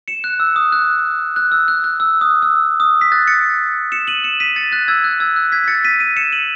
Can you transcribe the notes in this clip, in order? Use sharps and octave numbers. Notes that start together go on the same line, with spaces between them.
C#7 E7
F#6
E6
D#6
F#6
F#6
E6
F#6
F#6
E6
D#6
E6
D#6
B6
F#6 A6
A6 C#7
C#7 E7
D#7 F#7
C#7 E7
B6 D#7
A6 C#7
F#6 A6
E6 G#6
F#6
E6 G#6
F#6
G#6 B6
B6
A6 C#7
B6 D#7
B6 D#7
C#7 E7
D#7 F#7